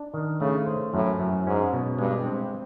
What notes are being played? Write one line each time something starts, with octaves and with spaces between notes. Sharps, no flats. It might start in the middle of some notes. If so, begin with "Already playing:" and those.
Already playing: D4
D#3
C#3 A3
C5
F#2 A2
F#2
G#2 C#4
B2
G2 G#3
C4